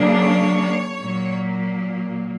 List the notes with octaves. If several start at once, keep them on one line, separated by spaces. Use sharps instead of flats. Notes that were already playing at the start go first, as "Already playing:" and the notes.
Already playing: C#3 F#3 A#3 D4
C#5
A#2 F#3 A#3